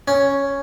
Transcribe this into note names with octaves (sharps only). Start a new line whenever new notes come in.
C#4